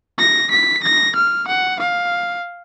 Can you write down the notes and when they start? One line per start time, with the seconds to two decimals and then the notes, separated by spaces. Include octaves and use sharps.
0.19 A#6
0.51 B6
0.83 A#6
1.16 F6
1.48 F#5
1.80 F5